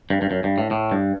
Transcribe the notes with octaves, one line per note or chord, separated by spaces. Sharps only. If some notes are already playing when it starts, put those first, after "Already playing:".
G2
G2
F#2
G2
A2
A2
G2